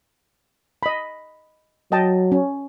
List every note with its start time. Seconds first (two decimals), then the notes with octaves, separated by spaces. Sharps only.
0.83 D#5 B5
1.92 F#3 D#5 G5 A5
2.32 C#4